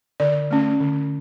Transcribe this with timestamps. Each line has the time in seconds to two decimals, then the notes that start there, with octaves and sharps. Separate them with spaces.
0.20 D3 D5
0.51 A3 C#4
0.81 D3